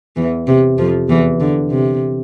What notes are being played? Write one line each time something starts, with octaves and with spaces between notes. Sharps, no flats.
E2 E3
C3
F2 F3
E2 E3
D3
C3